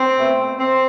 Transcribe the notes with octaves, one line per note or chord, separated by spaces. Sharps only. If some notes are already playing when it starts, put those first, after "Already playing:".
Already playing: C4
B2 A3
C4